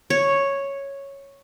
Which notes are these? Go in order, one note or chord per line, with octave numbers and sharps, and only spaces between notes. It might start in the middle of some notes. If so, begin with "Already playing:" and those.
C#5